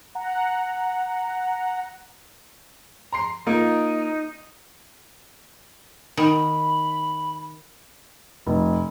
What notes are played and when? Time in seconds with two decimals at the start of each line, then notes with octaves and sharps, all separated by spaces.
0.15 F#5 A#5
3.12 A#5 C6 C7
3.47 A#3 D#4 F4
6.17 D#3 B5
8.47 F1